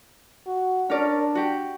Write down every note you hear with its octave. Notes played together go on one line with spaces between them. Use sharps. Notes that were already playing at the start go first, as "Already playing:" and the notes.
F#4
C#4 D4 A#4 D5
F#4 G4